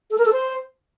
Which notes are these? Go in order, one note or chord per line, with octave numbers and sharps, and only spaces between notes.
A4
A#4
A4
C5